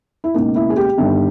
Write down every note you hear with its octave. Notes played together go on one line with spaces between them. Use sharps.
E4
C#2 B2 A#3 D#4
E4
G#4
G4
G1 G2 D#3 G3